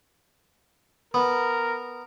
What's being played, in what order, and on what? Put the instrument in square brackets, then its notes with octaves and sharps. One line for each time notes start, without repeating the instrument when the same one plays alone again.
[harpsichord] B3 [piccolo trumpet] A#4